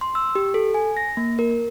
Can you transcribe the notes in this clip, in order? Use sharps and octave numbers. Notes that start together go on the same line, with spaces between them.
C6
E6
G4
A4
G#5
A#6
A#3
A#4